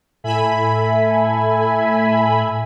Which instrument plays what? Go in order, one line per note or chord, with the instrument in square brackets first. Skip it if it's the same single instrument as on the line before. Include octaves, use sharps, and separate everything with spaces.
[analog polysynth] A2 A4 E5 G#5 B5